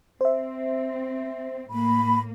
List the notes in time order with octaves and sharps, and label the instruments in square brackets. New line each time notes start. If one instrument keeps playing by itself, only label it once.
[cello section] C4 [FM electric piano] C5 E5
[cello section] A2 A#3 [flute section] B5